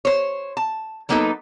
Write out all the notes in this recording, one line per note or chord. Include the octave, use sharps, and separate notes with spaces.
C5 C#5
A5
F#3 G3 A#3 B3 D#4 A4